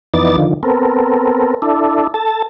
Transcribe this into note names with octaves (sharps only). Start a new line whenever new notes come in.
F2 E3 B3 D#4 D5 A6
D3 D#3 F3
B3 C4 A4 A#4
D4 E4 A4
A4 A5